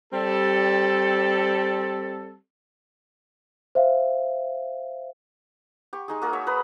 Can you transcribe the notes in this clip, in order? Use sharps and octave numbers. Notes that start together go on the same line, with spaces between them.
G3 C4 A4
C5 E5 F5
G4 C#6
G#3 D#4 G#4
A#3 F#4 G#4 A#4
C#5 E5
A#4 B4 B5 D#6